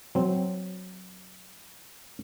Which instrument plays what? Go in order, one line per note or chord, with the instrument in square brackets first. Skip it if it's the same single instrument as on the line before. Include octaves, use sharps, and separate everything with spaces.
[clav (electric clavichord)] F#3 C4